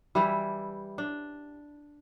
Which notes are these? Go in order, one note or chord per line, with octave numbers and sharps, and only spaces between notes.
E3 G3 E4 G4
D4